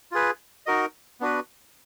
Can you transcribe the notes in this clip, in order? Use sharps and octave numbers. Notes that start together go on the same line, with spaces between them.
F4 G#4 B4
D#4 F#4 A#4 D#5
B3 D4 F#4 B4